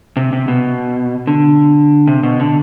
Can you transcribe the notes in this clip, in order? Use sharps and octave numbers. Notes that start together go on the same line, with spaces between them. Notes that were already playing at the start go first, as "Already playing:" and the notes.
C3
C3
B2
D3
C3
B2
D3